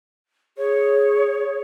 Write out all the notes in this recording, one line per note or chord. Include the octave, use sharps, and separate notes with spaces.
G#4 C#5